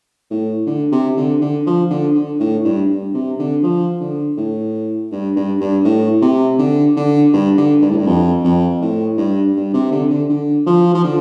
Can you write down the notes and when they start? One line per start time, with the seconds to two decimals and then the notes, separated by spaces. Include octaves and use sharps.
0.31 A2
0.67 D3
0.92 C3
1.17 D3
1.41 D3
1.67 F3
1.90 D3
2.15 D3
2.39 A2
2.65 G2
2.90 G2
3.14 C3
3.39 D3
3.63 F3
4.00 D3
4.37 A2
5.12 G2
5.36 G2
5.61 G2
5.85 A2
6.22 C3
6.59 D3
6.97 D3
7.33 G2
7.58 D3
7.82 G2
7.91 A2
7.98 G2
8.07 F2
8.44 F2
8.81 A2
9.18 G2
9.56 G2
9.73 C3
9.92 D3
10.10 D3
10.29 D3
10.66 F3
10.94 F3
11.04 D3